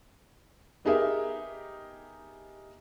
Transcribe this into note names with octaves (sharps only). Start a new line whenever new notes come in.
B3 D#4 G4 G#4 A#4 E5